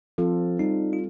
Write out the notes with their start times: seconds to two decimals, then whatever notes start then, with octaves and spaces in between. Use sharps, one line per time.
0.18 F3 C4 F4 A4
0.59 G3 D#4
0.93 F4